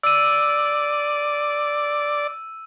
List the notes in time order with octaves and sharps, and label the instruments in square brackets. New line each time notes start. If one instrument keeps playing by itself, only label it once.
[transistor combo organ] D5 [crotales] E6 D#7